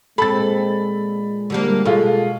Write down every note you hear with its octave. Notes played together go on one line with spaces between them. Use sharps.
A#2 G#3 C4 A4 B5 A6
D3 G3 A#3
B2 G#3 F4 A4